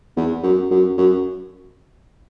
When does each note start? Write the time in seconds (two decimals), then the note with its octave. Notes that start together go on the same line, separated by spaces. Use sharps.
0.17 E2
0.43 F#2
0.71 F#2
0.97 F#2